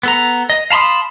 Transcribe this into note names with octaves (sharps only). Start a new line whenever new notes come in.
B3 A4 A#5
D#5
F5 A5 B5 C6 D#6